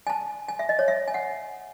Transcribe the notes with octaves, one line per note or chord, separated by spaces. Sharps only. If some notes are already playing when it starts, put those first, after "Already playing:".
G#5
A5
G#5
E5
D#5
C#5
E5
G#5
F#5